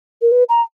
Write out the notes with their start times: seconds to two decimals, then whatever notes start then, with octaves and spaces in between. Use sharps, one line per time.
0.22 A#4
0.32 B4
0.49 A#5